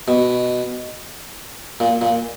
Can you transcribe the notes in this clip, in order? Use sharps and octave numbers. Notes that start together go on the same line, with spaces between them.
B2
A#2
A#2